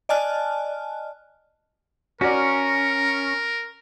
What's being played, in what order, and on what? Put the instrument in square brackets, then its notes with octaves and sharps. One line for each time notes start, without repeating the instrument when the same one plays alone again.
[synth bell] D5 D#5 G#5 A5 F6 F#6
[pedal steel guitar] C#4 [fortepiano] F#4 D5 [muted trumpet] A#4 [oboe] A#5